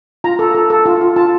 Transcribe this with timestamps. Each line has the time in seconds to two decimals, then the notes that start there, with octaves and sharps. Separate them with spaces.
0.24 F4 A#5
0.39 A4
0.54 A4
0.70 A4
0.86 F4
1.01 F4
1.16 F4 A5